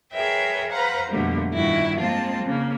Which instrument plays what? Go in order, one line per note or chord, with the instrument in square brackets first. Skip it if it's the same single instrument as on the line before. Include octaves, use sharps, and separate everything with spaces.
[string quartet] G#4 A#4 B4 C#5 E5 G5
B4 C5 F5 F#5 A#5
F2 B2 D3 G3 A3 A#3
G2 A#2 D#3 E4 F#4
G#3 A#3 C4 F4 A5
C#3 A#3